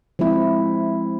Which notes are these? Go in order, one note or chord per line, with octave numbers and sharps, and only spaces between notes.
F3 G#3 C4 E4